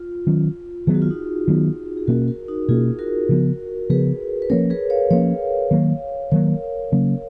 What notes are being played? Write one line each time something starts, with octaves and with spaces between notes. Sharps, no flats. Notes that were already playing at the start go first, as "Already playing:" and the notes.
Already playing: F4
D#3 F#3 C#4
D#3 F#3 B3 G#4
F#4
F4
D#4 F#4
D#3 F#3 B3
G#4
B2 A#3 C#4 F#4 A#4
F#4 A#4
D#4 F#4
B2 A#3 C#4 F4 G#4
F#4 A#4
C#3 F3 B3
C#3 F3 B3 G#4 B4
B4
F3 A#3 C#4 A#4 C#5
G#4 B4
C#5 F5
F3 A#3 C#4 C#5 F5
D#3 F#3 A#3
D#3 F#3 A#3 A#4 C#5
C#3 F#3 A#3 C#4